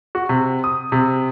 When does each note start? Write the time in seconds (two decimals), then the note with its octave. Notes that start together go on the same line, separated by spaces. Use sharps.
0.15 F#4
0.29 C3
0.64 D#6
0.92 C3